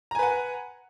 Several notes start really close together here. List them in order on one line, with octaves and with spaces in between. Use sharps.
A#5 G#5 B4 F#5